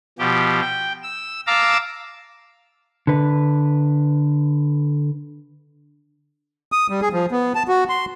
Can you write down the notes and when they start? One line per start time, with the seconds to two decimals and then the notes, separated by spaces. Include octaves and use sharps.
0.19 B2 F3 G4
0.61 G5
1.03 E6
1.47 F5 A5 A#5 D6 E6
3.07 D3 B4
6.72 D#6
6.90 G3
7.02 G#4
7.13 F3
7.32 B3
7.55 A5
7.68 F#4
7.89 C6